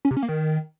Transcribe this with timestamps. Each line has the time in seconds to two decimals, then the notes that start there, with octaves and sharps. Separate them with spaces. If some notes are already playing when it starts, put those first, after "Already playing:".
0.05 C#4
0.11 C3
0.17 C#4
0.23 A#3
0.29 D#3